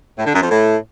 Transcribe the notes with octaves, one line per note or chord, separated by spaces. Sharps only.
A2
D3
F#2
F2
A2